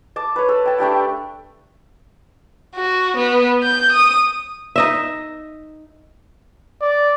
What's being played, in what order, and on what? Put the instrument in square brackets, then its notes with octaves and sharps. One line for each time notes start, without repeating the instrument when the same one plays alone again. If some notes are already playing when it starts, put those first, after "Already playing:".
[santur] A5 D6
B4 C#5
A4
G5 A5
A3 D4 G4 G5
[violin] F#4
B3
G6
D#6
[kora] D#4 D#5 E5
[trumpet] D5